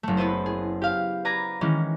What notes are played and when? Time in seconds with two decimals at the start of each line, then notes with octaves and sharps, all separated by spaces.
0.03 F#1 A3
0.17 B3 E4 B4 C5
0.46 G#4
0.82 G4 F5
1.25 B4 D5 A#5 G#6
1.61 D#3 E3 G#3 C#4